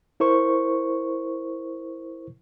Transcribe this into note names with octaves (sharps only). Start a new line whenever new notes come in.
E4 A#4 C5 C#6